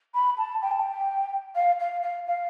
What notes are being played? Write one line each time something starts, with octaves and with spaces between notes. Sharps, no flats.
B5
A5
G5
A5
G5
F5
F5
F5
F5